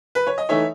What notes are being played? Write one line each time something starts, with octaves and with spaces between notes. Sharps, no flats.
B4
C#5
D#5
E3 A3 D#4 C#5 E5